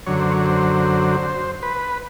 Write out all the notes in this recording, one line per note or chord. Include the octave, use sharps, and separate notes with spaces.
F#2 D3 F#3 C#5
C5
C#5
C5
B4